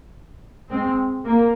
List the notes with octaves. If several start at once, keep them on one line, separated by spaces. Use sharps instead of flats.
G#3 C4
A#3